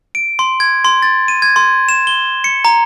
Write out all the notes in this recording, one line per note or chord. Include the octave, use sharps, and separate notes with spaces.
D7
C6
G#6
C6
A6
D#7
G#6
C6
E7
G7
C#7
A#5